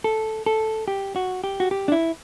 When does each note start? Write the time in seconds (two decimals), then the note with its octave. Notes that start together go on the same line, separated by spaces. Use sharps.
0.04 A4
0.46 A4
0.88 G4
1.16 F#4
1.44 G4
1.60 F#4
1.71 G4
1.88 D4
1.92 E4